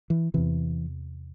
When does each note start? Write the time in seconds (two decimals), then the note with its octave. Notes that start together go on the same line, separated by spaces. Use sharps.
0.10 E3
0.34 E2 C3 E3